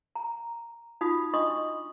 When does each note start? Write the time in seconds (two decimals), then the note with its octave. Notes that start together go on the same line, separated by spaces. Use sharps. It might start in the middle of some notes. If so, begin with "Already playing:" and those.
0.16 A#5
1.01 D#4 F4 F#4 B5 D#6
1.34 D4 D#5 C6 C#6 D#6